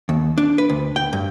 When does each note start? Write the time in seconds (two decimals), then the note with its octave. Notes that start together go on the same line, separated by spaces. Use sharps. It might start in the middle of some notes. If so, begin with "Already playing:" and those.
0.09 D#2
0.38 D4
0.58 B4
0.69 D2
0.96 G5
1.13 G2